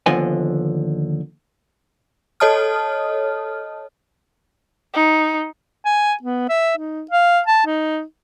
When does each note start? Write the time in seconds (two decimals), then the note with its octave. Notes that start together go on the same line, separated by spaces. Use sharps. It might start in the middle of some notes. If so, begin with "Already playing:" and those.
0.06 D#2 D3 F3 B3 D#5 G#5
2.40 A4 C#5 D#5 A5 D#6 F6
4.93 D#4
5.85 G#5
6.23 B3
6.49 E5
6.77 D#4
7.11 F5
7.46 A5
7.66 D#4